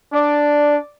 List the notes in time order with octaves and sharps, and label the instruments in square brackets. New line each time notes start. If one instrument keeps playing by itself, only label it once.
[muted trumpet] D4 [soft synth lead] D5